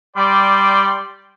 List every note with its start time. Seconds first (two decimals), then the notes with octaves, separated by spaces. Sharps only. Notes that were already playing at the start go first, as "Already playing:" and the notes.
0.17 G3 D5 G5 C6